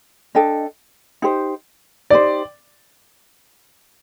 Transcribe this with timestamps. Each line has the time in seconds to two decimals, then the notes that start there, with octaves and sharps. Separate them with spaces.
0.35 D4 A4 D#5 G5
1.22 D#4 G4 C5
2.10 D#4 G4 C5 D5